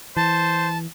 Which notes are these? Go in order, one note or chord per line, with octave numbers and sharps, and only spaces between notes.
E3 C5 A5